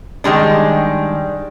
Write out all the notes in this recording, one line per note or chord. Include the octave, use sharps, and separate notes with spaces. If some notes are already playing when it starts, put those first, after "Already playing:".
D#3 G3 G#3 D4